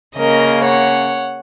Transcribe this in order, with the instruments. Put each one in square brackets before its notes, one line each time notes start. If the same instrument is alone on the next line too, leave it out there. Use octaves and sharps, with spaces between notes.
[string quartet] C#3 A#3 C#4 A#4 D#5
C#5 F#5